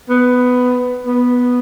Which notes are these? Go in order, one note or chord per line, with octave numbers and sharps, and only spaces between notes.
B3
B3